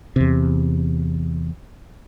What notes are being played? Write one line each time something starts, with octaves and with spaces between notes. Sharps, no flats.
E2 C3